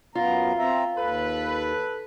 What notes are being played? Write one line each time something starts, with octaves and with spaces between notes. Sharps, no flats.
F#2 B3 F4 A#5
C4 E5 A#5
D#2 A4 B4